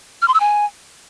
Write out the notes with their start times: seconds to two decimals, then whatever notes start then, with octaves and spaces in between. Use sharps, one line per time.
0.22 F6
0.28 C6
0.34 E6
0.40 G#5